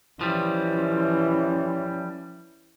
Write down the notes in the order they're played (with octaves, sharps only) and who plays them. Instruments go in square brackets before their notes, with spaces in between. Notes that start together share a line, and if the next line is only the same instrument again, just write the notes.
[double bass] E3 [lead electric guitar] F3 G3 [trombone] C#4